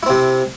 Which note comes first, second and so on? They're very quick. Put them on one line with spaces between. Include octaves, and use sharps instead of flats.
E4 C4 C3